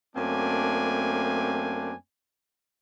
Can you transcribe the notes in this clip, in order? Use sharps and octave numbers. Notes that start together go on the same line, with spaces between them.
F#2 A3 A#3 C4 D4 G#5